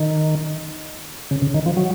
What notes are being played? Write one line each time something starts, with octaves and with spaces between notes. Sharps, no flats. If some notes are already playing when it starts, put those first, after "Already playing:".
Already playing: D#3
C#3
C#3
D#3
F3
F#3